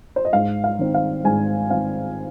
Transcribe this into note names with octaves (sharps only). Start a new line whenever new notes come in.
C5
D#5
G#2 F5
F5
D#3 C4
F5
G#2 G#5
D#3 C4 F5